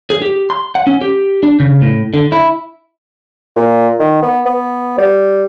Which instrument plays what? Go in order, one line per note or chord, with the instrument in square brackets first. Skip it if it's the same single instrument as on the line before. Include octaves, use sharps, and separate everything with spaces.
[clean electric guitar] G#4
G4
C6
F#5
C#4
G4
D4
C#3
A2
D3
E4
[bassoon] A#2
D#3
B3
B3
G3